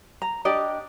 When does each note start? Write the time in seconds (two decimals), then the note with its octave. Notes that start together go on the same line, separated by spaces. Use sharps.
0.22 A#5
0.45 D4 G4 D5 D#5